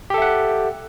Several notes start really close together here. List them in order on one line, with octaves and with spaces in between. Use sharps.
G4 A4 E5 F#5